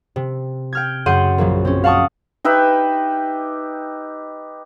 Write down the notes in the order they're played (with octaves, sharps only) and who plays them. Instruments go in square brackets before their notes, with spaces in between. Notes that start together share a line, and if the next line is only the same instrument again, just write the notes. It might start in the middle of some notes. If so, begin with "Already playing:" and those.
[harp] C3
G5 F6 G#6
F#2 C#3 F#5 C6 G6 D#7
A#1 F#3 A#3
C4 C#4
F5 F#5 A5 C#6 D#6
[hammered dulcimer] D#4 G4 B4 E5